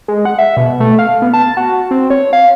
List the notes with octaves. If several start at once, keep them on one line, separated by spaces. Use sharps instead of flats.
G#3
F#5
E5
B2
A3
F5
B3
A5
F#4
C4
C#5
F5